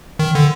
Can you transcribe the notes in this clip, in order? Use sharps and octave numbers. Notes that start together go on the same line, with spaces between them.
D#3
D3